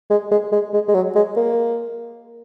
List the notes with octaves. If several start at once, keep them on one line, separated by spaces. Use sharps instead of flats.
G#3
G#3
G#3
G#3
G#3
F#3
G#3
A#3